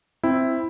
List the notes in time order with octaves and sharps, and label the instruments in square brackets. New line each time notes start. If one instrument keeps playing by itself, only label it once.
[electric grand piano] C4 E4